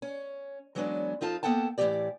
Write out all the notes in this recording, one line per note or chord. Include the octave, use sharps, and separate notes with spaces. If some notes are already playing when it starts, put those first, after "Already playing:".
C#4
E3 F#3 G#3 B3 C#4 D4
F2 D#4 F4 A4 A5
A#3 B3 A4 F#5 G5 A5
A2 E3 A#3 F4 G4 D5